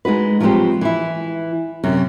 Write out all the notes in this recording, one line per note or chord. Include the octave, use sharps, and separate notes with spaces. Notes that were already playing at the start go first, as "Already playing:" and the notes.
G#3 D#4 F#4 B4
F3 F#3 G#3 C4 G4 C5
E3 E4
F#2 C3